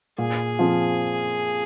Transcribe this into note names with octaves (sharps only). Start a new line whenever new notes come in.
A#2 G#4
F3 C4 F4